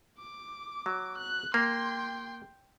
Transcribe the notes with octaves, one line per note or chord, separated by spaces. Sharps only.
D6
F#3
F#6
A#3 G5 C6